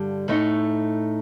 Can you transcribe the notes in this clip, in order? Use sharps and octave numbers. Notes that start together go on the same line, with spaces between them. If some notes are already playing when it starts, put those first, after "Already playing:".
Already playing: G2 D3 G3
A2 A3 D#4